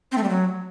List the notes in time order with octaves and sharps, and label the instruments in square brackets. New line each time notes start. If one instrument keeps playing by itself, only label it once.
[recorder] C4
A3
G3
F#3